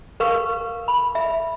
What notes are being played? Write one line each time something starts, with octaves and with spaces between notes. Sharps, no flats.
A#4 B4 F5 C#6
B5
E5